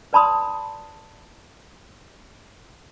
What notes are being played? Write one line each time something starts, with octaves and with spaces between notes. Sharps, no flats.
B4 D5 A5 B5 C6 D#6